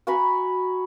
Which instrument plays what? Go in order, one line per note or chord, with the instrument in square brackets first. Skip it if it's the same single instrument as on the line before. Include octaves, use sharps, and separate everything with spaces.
[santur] F#4 G#5 A#5 B5